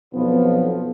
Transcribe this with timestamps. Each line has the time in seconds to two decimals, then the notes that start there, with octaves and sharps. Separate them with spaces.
0.13 B1 F2 F3 B3